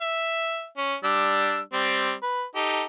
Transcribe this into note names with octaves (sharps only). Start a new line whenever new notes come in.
E5
C#4
G3 D4 E6
G3 C4
B4
D#4 G4 A4